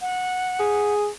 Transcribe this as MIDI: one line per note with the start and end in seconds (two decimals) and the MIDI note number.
0.01 0.94 78
0.60 1.08 68